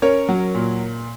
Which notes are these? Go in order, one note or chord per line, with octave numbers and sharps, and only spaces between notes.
C#4 A#4 C#5
F#3
A#2